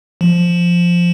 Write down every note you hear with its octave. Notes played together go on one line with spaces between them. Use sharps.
F3